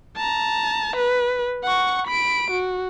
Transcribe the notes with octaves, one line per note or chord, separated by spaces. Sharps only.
A5 A#5
B4
F#5 C#6
B5 D7
F#4